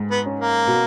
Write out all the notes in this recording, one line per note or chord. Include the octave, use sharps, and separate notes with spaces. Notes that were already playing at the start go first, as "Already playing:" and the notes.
Already playing: G#2
B3
C#4
A#3
B2